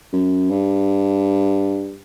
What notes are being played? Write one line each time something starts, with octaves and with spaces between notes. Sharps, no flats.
F#2
G2